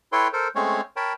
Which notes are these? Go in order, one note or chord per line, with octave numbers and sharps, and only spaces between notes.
E4 A4 B4 C#5 G5 C6
A4 A#4 C5
G#3 A3 C4 C#4 C#5
A#4 C#5 G5 A5 B5